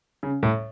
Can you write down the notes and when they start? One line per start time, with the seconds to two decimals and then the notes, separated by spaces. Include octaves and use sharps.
0.23 C#3
0.43 A2